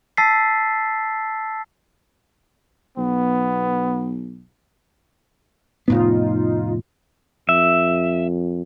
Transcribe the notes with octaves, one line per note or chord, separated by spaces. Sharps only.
A5 E6 A6 B6 C7
B1 B3
F1 A2 B3 D#4 F4
F2 E5